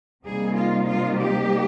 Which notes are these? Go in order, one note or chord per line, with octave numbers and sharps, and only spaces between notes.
C3 G3 A#3 D#4 G#4
F4
F4
G4